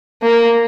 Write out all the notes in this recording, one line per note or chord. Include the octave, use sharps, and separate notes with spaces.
A#3